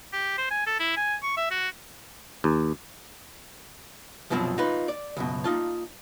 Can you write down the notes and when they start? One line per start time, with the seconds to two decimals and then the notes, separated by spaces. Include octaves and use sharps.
0.13 G4
0.38 C5
0.51 G#5
0.67 A4
0.79 E4
0.96 G#5
1.23 C#6
1.37 E5
1.51 F#4
2.44 D#2
4.30 C2 F#2 B2 F3 F#3 C4
4.58 D#4 F4 B4
4.88 D5
5.17 C#2 F#2 B2
5.44 A#3 D#4 F4 A5